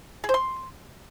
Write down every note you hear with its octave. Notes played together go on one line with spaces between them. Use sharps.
G#4
C5
C6